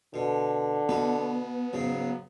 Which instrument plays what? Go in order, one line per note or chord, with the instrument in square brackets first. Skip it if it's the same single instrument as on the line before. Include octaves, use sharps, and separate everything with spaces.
[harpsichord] B2 [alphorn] D3
[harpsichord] B2 B4 [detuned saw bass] B3
[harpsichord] G#2 C#3 [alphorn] F#3